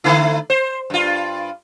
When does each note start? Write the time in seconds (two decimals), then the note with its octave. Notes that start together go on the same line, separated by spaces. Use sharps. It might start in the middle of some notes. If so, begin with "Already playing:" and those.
0.04 D3 A3 E4
0.50 C5
0.90 G2 F4